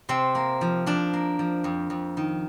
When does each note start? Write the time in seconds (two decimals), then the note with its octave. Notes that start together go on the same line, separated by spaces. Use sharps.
0.09 C3 C4
0.35 A#3
0.61 F3
0.86 F3 D4
1.13 A#3
1.39 F3
1.64 F2
1.90 F2
2.17 D#3